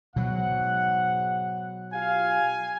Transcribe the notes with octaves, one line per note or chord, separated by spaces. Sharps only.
G#2 B2 F#3 F#5
F4 G4 F5 G#5